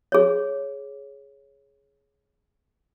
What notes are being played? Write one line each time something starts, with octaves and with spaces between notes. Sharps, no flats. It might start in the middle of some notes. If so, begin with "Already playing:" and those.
G#4 C#5